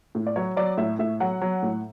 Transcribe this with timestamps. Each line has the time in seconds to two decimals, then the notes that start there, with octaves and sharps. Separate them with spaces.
0.15 A2
0.27 D5
0.36 F#3 C#5
0.56 F#3 D5
0.77 A2 E5
0.99 A2 E5
1.20 F#3 F#5
1.42 F#3
1.62 A2